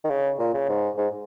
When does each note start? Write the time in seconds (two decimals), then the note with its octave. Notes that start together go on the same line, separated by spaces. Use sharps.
0.04 D#3
0.10 C#3
0.39 A#2
0.54 C#3
0.69 G#2
0.98 G#2